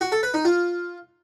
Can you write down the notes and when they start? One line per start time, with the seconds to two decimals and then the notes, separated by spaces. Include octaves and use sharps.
0.01 F#4
0.12 A4
0.23 B4
0.34 D#4
0.45 F4